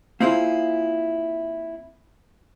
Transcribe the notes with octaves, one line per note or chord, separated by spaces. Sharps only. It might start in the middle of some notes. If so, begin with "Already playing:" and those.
A#3 C4 E4 F4 G#4